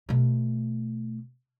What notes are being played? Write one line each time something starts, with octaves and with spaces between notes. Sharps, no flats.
B2 A3